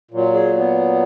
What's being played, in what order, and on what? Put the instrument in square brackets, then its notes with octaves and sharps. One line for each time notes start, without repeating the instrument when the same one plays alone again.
[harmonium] A#2 F#3
G#4
B3